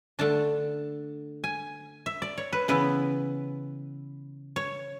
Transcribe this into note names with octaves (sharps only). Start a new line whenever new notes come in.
D3 A3 D4 A5
G#5
E5
D5
C#5
B4
C#3 E3 B3 E4 B4
C#5